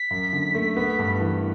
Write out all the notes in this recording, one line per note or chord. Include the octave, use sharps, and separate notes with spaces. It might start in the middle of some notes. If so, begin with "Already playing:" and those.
Already playing: B6
F#2
D3
A3
B3 B6
G2
E3